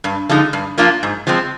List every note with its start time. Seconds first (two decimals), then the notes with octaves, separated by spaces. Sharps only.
0.04 G2
0.29 D3 F3 G#3 D#4
0.53 G2
0.78 F3 A#3 D4 F4
1.03 G#2
1.27 F3 G#3 C4